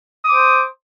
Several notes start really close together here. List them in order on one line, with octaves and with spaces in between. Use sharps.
D#6 D6 C5